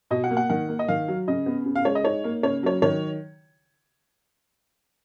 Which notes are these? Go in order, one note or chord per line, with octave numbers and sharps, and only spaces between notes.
B2 D#5
F#5
A#3
F#5
D#3 F#5
A#3
D#5
D#3 F5
F#3
C#3 D#5
B3
C#3
F5
G#3 C#5
D#5
D#4 C#5
A#3
C#3 C#5
F#3 C#5
D#3 C#5